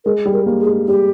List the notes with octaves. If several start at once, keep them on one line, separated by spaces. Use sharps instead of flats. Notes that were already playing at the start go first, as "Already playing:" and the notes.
G#3 A#4
G3
A#4
A#3
G#4
G#3
G3 G4